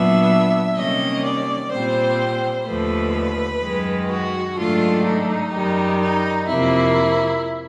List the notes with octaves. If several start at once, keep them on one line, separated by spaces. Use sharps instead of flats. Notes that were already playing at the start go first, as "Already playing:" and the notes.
Already playing: A#2 F#3 B3 D4 E5
C3 D#3 G3 A#3 C#4 D#5
D5
A#2 G3 C4 C5
D#2 D3 F3 A3 B4
F#2 D#3 G#3
F#4
G#2 D#3 F#3 A3 D4 F4
D#4
F#2 D#3 G3
D#4
F2 C3 F3 A#3 E4